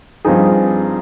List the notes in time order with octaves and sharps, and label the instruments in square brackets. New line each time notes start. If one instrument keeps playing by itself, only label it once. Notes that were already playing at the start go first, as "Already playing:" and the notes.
[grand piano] G2 F3 C4 D#4 G#4